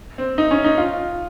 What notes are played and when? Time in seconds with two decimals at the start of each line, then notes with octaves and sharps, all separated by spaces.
0.18 C4
0.38 D#4
0.51 C#4
0.64 D#4
0.78 F4